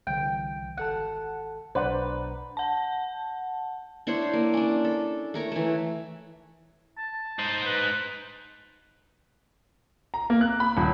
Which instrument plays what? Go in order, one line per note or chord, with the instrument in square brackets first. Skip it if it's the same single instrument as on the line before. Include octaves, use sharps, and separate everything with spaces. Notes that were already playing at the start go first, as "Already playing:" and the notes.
[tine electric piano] C2 D3 E3 [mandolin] G5
[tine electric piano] G#1 A4 A5 [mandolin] F#5
[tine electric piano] B1 D4 A#5 [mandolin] B4 [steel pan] C5 D5 F#5
[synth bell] F#5 A5
[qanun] D4 E4 C5 C#5
A#3
C#4 D4
A4
A3 A#4 C#5
E3 A3
[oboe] A5
[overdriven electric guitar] D#4 C5
[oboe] B4
[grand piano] A#5
A#3
F#6
B5
D#1